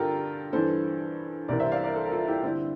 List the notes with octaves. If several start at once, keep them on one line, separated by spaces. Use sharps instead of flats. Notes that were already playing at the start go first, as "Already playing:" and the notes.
Already playing: G2 D3 F4 G4 A4 A#4
G2 E3 A4 C5
C2 C3 E3 A#4 D5
C5 E5
D5 F5
A#4 D5
A4 C5
A#4
F4 A4
E4 G4
G2 D3 C4 E4